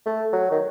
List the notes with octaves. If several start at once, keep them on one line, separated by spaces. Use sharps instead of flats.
A3
F#3
D#3